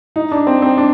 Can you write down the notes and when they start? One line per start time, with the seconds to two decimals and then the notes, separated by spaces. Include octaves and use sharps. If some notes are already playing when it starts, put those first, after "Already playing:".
0.16 D#4
0.32 D4
0.47 C4
0.62 C4
0.78 D4